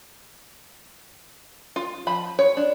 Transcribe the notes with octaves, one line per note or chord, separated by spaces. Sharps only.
F4
F3 B5
C#5
D4